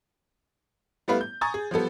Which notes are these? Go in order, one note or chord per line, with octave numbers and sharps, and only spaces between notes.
G3 A3 B3 E4 B4 F5
G6
G#5 A#5 C#6 D#6 G#6 A6
G#4
F3 G3 B3 A4